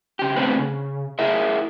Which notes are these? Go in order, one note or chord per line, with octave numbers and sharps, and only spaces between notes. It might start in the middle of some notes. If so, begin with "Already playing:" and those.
C#3 G4
A2 D3 C4 C#4 B4
C#3
E4 G#4 A#4 E5